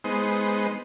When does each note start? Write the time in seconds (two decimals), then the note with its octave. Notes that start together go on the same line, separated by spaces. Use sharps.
0.04 G#3 B3 D#4 C5